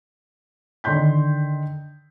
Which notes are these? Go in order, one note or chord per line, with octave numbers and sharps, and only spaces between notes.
D3 D#3 C6 G6 B6